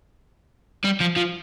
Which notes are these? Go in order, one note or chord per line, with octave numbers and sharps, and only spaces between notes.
G3
F3
F3